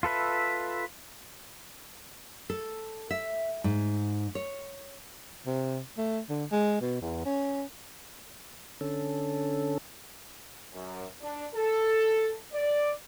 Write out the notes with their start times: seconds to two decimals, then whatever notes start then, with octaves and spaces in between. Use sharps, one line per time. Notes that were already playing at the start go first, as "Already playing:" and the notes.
0.03 F4 A4 B4 E5
2.50 A4
3.11 E5
3.64 G#2
4.35 C#5
5.46 C3
5.97 A3
6.29 D3
6.51 G#3
6.81 B2
7.01 E2
7.25 C#4
8.81 D3 C#4 A4
10.72 F#2
11.21 D4
11.54 A4
12.53 D5